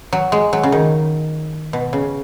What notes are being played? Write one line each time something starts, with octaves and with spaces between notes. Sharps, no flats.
F#3
G#3
F#3
C#3
D#3
B2
C#3